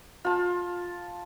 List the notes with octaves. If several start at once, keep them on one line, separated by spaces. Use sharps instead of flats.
F4 A5